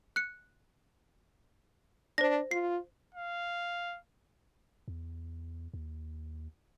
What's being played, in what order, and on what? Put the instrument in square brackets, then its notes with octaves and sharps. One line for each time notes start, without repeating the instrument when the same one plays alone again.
[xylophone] F#6 C#7
[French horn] D4 [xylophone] C5 A#6
[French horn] F4 [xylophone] C7
[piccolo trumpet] F5
[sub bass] E2
D#2